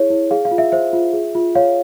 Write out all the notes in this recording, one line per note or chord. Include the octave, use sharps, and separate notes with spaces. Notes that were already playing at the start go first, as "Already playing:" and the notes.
Already playing: E4 G#4 C#5
E4
G#4 F5
F5
F4
E5
C5 E5
F4
G#4
F4
C#5 F5